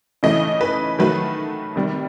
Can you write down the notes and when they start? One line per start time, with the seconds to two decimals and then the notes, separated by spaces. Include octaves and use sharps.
0.23 C#3 E3 A3 D#5
0.61 B4
0.99 D#3 F#3 A3 B4
1.76 C3 D#3 G3